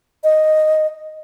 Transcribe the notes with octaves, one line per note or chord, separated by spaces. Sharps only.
D#5